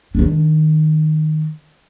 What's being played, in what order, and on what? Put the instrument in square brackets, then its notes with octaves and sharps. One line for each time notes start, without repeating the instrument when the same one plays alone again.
[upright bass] D#3 D4